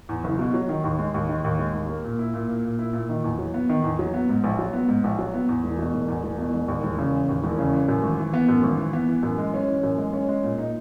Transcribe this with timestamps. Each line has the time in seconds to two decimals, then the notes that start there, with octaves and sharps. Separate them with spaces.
0.09 E2
0.24 F#1
0.39 B2
0.54 F#3
0.69 D#3
0.84 D#2
0.99 G#3
1.14 D#2
1.29 D#3
1.44 D#2
1.59 G#3
1.74 D#2
1.89 A#3
2.04 A#2
2.19 E4
2.34 A#2
2.49 A#3
2.64 A#2
2.79 E4
2.93 A#2
3.09 D#3
3.24 E2
3.39 F#3
3.54 B3
3.69 D#3
3.84 E2
3.99 F#3
4.14 B3
4.29 G#2
4.44 A#1
4.59 F#3
4.73 B3
4.89 G#2
5.04 A#1
5.19 F#3
5.34 B3
5.49 E2
5.64 E1
5.79 B2
5.94 E1
6.08 E2
6.24 E1
6.38 B2
6.54 E1
6.68 D#2
6.84 E1
6.99 C#3
7.13 E3
7.29 D#2
7.44 E1
7.59 C#3
7.73 E3
7.89 F#2
8.03 G#1
8.18 E3
8.34 B3
8.49 F#2
8.63 G#1
8.78 E3
8.93 B3
9.09 E3
9.23 F#2
9.39 G#3
9.54 C#4
9.68 E3
9.83 F#2
9.98 G#3
10.13 C#4
10.28 G#3
10.43 A#2
10.58 D#4